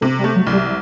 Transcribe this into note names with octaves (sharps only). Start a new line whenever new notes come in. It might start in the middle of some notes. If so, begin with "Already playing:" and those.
C3 A3
G3
A3
F#3
C2
G3